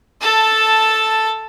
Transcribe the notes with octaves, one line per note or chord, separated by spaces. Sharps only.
A4 A5